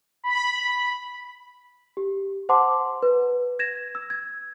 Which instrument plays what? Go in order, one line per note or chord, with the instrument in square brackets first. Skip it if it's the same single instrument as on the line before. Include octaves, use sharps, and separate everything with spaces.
[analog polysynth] B5
[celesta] G4
C5 F#5 A5 C6 D6
B4
G#6 A#6 E7
E6
G#6